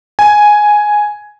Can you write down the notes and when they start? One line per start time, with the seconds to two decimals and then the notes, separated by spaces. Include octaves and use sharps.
0.19 G#5